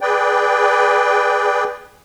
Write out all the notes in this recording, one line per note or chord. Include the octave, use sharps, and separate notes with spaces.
G#4 B4 D5 G5